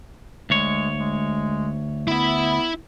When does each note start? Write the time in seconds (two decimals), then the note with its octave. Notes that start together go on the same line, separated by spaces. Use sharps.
0.50 D2 G#3 C#5
0.98 G#3
2.07 B3 E4 E5